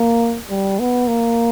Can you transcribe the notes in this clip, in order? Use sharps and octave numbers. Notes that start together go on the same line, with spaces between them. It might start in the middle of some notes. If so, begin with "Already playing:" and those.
Already playing: A#3
G3
B3
A#3